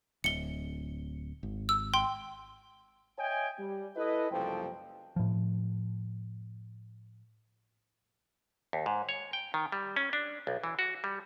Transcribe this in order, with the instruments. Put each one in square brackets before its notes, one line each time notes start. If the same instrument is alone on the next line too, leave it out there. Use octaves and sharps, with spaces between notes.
[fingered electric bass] D1 [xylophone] C#7 G7
[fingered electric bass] G#1
[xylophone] E6
G5 C6
[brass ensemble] C#5 D#5 E5 G5 G#5
G3
E4 A4 B4 D#5
F#1 C2 F3 A4 C5 G5
[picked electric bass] A2 F3
[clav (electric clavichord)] D#2
G#2
C#5
G5
D#3
G3
C#4
D4
B1
E3
F#4
G3